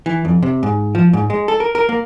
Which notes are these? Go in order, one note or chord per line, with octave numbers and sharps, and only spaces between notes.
E3
F2
C3
G#2
F3
G#2
G#3
A4
A#4
A#4
A#3